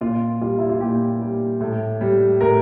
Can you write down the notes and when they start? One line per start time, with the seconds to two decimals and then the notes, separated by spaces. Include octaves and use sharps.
0.01 A#2 F4
0.41 G3 F4
0.59 E4
0.69 F4
0.81 A#2 G4
1.20 G3
1.61 A2
2.01 G3
2.41 A2 A#4